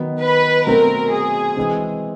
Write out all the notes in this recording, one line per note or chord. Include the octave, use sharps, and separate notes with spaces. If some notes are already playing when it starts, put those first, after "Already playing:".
Already playing: D#3 F#3 B3
B4
B2 F#3 A3 C4 A#4
G#4
E3 G#3 C4